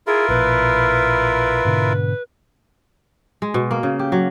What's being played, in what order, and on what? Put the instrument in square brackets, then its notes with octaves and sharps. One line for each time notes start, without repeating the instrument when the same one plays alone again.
[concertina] E4 F4 A#4 [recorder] G#4
[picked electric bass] A#1 B2 [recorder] B4
[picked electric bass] G#2 B2 D3
[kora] G#3
B2
A#3
C#3
G4
F#3